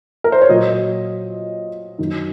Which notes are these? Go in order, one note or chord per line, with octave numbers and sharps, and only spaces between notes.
A#4
C5
C#5
A#2 F#3 D#5
F#2 D#3 F#3